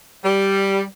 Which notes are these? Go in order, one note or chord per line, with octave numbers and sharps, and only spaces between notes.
G3